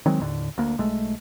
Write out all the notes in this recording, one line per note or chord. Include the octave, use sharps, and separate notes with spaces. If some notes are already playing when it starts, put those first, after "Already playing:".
D#3 F#3 G#3 C4
D#2 A2 D3
D2 A#3
B1 G#3 A3